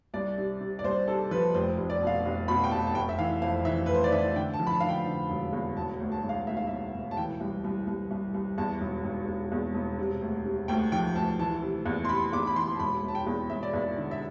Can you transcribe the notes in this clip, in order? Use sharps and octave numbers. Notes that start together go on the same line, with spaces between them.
C2 D5
C3
C3
D5
C2 C5
C3 A4
F3 B4
F1 C5
F1
D5
B2
F5
F1
B2 B5
G5
F1 A5
A5
F1 G5
E5
E3 F5
F2 F5
E3 E5
F1 B4
C5
D5
E3 E5
D3 G5
A5
F3
B5
A5
D3 F5
G5
D3
E1
E2
E1 A5
D2
A5
E1
F5
D2 E5
F5
E1 E5
E1
A5
E3 G5
C2
C2
C2
C2
C2
E2 A5
E1
E1
E1
E2
E1
C3
D2
C3
D2 G5
F3 G5
D2 A5
E3 A5
C3
E2
C6
C3 B5
E2 D6
B5
E3 C6
A5
E1 B5
E1
A5
G5
E2
E1 E5
D5
E2 E5
D3
E5